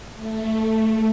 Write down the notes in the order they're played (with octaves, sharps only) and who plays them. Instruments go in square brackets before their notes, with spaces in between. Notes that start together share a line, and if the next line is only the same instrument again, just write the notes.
[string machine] A3